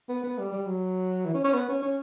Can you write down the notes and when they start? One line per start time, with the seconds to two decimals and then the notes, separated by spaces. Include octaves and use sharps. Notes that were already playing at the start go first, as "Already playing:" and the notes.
0.09 B3
0.24 B3
0.38 G3
0.53 G3
0.66 F#3
1.25 E3
1.34 C#4
1.44 C#4
1.54 B3
1.69 C#4
1.82 C#4